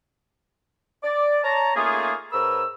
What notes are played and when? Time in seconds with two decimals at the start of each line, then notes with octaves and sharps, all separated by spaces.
1.03 D5
1.44 C#5 A5 A#5
1.75 A3 A#3 C#4 D#4 F4 G#4
2.32 G#2 A#4 B4 C#5 E6